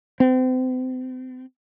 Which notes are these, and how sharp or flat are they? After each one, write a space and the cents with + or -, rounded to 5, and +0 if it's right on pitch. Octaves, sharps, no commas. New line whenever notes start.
C4 -35